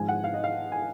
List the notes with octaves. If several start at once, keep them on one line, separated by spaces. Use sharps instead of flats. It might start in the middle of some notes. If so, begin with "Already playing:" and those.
Already playing: G#1 G#2 F3 G#3 G#5
F#5
F5
D#5
F5
G#5